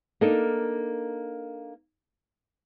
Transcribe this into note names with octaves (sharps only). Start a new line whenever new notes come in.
A#3 D4 D#4 A4 A#4